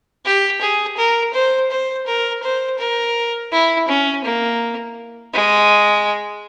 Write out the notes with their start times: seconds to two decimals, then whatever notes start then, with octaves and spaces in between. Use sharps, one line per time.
0.25 G4
0.61 G#4
0.97 A#4
1.33 C5
1.70 C5
2.06 A#4
2.43 C5
2.79 A#4
3.52 E4
3.88 C#4
4.24 A#3
5.34 G#3